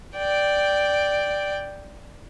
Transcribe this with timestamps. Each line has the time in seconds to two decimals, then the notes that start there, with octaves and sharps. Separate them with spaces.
0.17 D5 G5